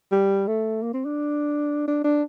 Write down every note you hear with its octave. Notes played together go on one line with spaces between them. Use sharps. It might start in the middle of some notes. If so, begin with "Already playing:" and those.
G3
A3
A#3
C4
D4
D4
D4